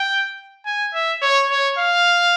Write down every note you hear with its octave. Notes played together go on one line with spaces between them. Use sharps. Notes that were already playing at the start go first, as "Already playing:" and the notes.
Already playing: G5
G#5
E5
C#5
C#5
F5